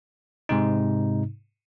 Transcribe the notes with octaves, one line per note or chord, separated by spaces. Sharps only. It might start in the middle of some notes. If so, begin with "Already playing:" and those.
G#2 C3 D#4